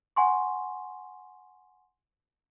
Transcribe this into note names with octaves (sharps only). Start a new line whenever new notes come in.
F#5 G#5 C6 C#6